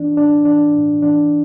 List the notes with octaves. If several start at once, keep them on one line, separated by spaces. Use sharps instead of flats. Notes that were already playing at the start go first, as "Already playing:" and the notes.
Already playing: E3 D4
A2 D4
E3 D4
A2
E3 D4